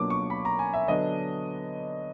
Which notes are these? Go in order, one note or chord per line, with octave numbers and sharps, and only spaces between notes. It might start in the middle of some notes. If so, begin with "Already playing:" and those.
Already playing: B2 F#3 A#3 D4 F4 D6
C#6
B5
A#5
G#5
E5
D3 F#3 B3 D4 D#5